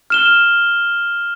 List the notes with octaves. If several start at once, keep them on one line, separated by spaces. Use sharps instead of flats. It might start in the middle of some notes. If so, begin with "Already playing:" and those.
F6 E7 G7